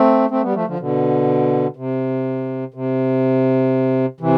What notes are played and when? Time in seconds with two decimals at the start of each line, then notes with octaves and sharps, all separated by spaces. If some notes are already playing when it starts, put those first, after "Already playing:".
Already playing: A3 C4
0.30 A3 C4
0.42 G3 B3
0.55 F3 A3
0.67 D3 F3
0.79 B2 D3
1.77 C3
2.74 C3
4.21 C3 E3